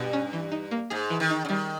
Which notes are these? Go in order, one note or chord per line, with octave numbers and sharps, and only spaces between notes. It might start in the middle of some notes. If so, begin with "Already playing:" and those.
Already playing: G2 B2
C#4
E3
D#4
A#3
G#2 G#4
E3
D#3
D#4
C#3
D#3 G3